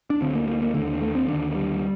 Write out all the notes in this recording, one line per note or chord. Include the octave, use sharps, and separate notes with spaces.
D4
D2 D3 C4
A#3
A#3
A#3
D#2 D3 A3
A3
C4
D#2 D3 D4
G3